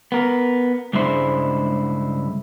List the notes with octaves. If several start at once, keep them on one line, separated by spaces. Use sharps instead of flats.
B3 A#4
C#2 G2 G#3 D4 E4 C5